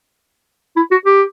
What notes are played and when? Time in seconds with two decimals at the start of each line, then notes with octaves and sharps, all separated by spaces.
0.76 E4
0.91 F#4
1.06 G4